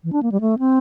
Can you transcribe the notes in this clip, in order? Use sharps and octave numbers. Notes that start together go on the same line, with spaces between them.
E3
D4
A#3
G3
A3
C4